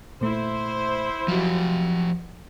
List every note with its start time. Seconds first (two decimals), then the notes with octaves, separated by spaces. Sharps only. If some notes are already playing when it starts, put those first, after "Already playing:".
0.21 A#2 A3 E4 C5
1.28 F3 F#3 F#4 G4